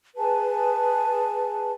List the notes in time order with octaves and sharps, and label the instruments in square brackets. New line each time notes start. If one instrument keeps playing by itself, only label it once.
[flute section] G#4 B4 G#5 A5